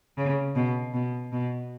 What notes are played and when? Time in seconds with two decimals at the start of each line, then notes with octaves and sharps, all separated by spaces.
0.18 C#3
0.56 B2
0.94 B2
1.32 B2